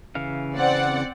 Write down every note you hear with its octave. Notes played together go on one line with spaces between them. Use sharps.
C#3 E3 F5
C4 D5 F#5